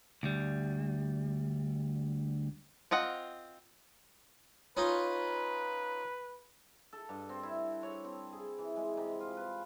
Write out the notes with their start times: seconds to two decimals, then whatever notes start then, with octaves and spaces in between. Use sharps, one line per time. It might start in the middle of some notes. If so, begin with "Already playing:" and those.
0.23 D2 G3
2.91 C4 F4 D#5 F#5
4.77 C#4 D#4 F4 B4
6.93 A4
7.09 G2
7.29 C4
7.43 E4
7.83 C#5
8.05 C4
8.33 G#4
8.58 E3
8.76 G#3
8.97 C3
9.20 F4
9.37 B4